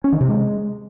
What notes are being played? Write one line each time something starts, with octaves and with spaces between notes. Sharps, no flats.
C#4
D#3
C3
G#3